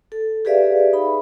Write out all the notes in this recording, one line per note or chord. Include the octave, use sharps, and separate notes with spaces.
A4
G4 G#4 B4 D5 E5 F5
D#4 B5